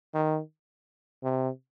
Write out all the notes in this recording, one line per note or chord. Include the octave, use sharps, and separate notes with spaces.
D#3
C3